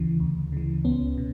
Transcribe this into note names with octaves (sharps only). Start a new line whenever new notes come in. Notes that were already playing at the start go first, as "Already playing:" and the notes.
Already playing: D2 C#3 E3
D2
C#3 E3
C#2 B3 C#4
B2